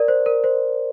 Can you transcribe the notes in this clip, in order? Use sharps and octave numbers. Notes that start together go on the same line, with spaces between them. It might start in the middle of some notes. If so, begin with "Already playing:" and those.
Already playing: A#4 D5
C5
A#4
C5